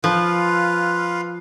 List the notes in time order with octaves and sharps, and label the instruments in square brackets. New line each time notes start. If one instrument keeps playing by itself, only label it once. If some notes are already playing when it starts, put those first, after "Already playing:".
[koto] F3 [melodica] F4 B4 F5